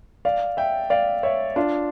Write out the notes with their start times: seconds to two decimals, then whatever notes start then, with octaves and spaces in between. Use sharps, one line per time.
0.25 D5 F5
0.57 E5 G5
0.90 D5 F5
1.23 C#5 E5
1.56 D4 F4